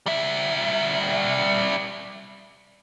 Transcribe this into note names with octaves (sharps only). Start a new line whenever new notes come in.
G3 E5